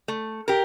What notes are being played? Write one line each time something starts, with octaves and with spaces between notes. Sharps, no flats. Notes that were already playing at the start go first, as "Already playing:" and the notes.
A3
G4 A#4